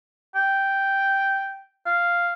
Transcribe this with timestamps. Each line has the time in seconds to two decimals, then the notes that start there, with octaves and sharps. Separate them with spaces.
0.35 G5
1.86 F5